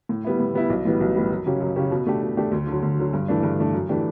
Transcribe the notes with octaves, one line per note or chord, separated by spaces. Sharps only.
A2
G3 B3 E4
A2
G3 B3 E4
B1
A2 E3 G3 B3
B1
A2 E3 G3 B3
F#2
C#3 F#3 C#4 G4
F#2
C#3 F#3 C#4 G4
B2
A3 D4 G4
B2
A3 D4 G4
D2
D3
F#3
D2
D3 F#3
G2
E3 A3 D4
G2
E3 A3 D4
F#2
E3 A3 D4 G4